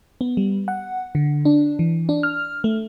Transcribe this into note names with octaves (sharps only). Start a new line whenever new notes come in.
B3
G3
F#5
D3
D4
E3
D4
F6
A3